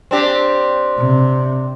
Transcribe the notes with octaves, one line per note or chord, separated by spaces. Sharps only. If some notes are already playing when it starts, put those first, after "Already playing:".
C4 D4 G4
C3